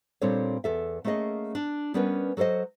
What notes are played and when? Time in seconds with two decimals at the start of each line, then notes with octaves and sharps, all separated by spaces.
0.21 A#2 G3 C4 D4 A4 C#5
0.64 E2 A4 E5
1.05 A3 A#3 C#4 G#4 D#5
1.55 D4
1.94 G3 B3 C#4 D4 A#4 B4
2.37 F#3 A4 A#4 C5 D#5